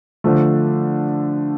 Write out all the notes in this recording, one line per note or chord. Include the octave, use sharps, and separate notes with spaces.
D3 F3 A3